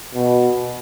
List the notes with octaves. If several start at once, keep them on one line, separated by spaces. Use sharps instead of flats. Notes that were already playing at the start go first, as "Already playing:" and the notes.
B2